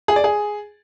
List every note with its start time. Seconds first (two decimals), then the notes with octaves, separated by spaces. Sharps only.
0.08 G#4
0.16 D5
0.24 G#4